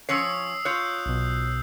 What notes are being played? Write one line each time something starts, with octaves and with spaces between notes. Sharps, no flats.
F3 C#4 C#5 D#6 E6 C7
F4 C#5 F#6 G6
B1 B2